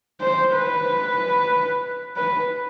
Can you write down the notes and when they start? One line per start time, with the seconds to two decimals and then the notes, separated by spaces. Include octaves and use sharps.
0.21 C5
0.55 B4
2.17 B4